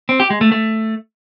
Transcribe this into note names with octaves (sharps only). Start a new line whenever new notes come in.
C4
G4
G#3
A3
A3